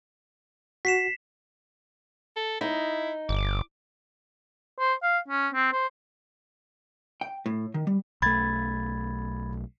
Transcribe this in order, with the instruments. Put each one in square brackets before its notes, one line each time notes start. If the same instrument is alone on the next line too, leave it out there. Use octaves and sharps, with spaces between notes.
[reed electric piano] F#4 [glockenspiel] B6 C7 E7
[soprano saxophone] A4
[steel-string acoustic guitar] D#4 [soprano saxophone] E4
[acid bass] G1 [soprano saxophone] D6
[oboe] C5
F5
C#4
C4
C5
[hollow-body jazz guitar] G5
A2
D#3
G3
[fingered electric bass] B1 A3 [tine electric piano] B5 G#6 A6